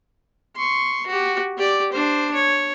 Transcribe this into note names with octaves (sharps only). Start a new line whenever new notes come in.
C6 C#6
F#4 G4
G4 D5
D4 C5
C#5